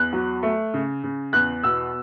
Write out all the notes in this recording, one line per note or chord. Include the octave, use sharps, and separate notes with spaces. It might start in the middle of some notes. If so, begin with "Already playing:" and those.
Already playing: E2 F#6
F#3
A3
C#3
C#3
E2 F#6
B2 E6